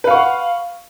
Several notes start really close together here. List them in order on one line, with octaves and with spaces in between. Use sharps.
B4 F5 C#6 F#5